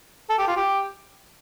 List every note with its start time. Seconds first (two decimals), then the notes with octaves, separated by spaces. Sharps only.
0.30 A4
0.38 G4
0.48 F4
0.56 G4